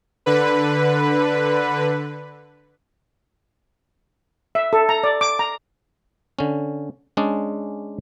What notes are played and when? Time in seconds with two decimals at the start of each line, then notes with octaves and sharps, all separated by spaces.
0.26 D3 B4
4.55 E5
4.73 A4
4.89 A#5
5.04 D5
5.21 D6
5.39 A#5
6.39 D3 C#4
7.17 G#3 C#4 D4 G#4 D5